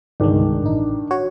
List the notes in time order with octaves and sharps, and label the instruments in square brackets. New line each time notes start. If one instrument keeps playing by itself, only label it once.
[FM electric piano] G1 C2 G#3 [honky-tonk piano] D#3 D4
[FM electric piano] A1 D#4
F#4 C#5